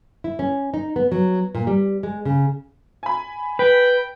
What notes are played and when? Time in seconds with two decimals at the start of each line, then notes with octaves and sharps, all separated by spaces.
0.24 E4
0.39 C#4
0.74 D#4
0.96 B3
1.12 F#3
1.55 A#2
1.67 G3
2.03 G#3
2.25 C#3
3.03 G#5 B5
3.59 B4 G5